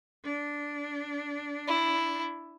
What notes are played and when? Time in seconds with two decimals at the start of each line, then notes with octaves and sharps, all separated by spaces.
0.24 D4
1.68 E4